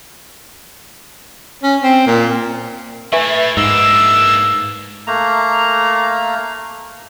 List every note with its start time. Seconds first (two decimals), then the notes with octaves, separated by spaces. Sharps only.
1.63 C#4
1.83 C4
2.07 A#2
3.13 A3 E4 B4 E5
3.57 G#2 A#3 D4 E6
5.07 A3 A#3 A#5